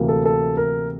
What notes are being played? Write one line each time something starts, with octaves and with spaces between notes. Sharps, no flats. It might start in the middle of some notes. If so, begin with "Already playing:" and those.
Already playing: D2 C3 E3 A#3
A4
A4
A#4